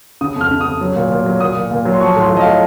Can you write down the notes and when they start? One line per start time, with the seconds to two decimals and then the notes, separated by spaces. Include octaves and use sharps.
0.21 C#3 D#6
0.36 F2
0.41 F6
0.51 C#3
0.61 D#6
0.66 F2
0.81 F#3
0.96 A#2
1.11 A#2
1.26 F#3
1.40 A#2 D#6
1.56 A#2
1.71 A#2
1.85 F#3
1.94 C6
2.01 F3 C#6
2.16 A2
2.21 C6
2.31 F3
2.37 D#5
2.41 F5
2.46 A2